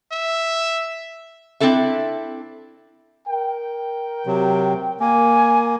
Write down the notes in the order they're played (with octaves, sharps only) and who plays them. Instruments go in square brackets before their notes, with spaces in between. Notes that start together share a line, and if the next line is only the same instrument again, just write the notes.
[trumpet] E5
[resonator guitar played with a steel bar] C4 D4 E4 A4 E5
[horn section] A#4 G5
[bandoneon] C3 F#3
[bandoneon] A#3 [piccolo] G#5